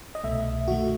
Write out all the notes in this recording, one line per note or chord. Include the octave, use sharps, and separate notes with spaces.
D#5
C2 B2 A3 E5
F#2 D#3 A3 F#4